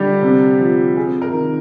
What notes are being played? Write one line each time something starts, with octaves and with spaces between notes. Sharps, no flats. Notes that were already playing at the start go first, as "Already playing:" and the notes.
Already playing: D3 G3 G4
C3
F3
C4 G#4
A#4
D#3